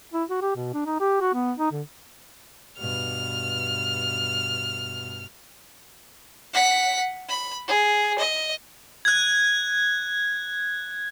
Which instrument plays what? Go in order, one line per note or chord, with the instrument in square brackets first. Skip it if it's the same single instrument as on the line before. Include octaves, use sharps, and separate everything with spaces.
[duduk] E4
F#4
G4
B2
D4
D#4
G4
F#4
B3
D#4
D3
[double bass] G2 B2 [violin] F6
[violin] F#5 B6
B5
G#4
D#5
[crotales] F#6 G#6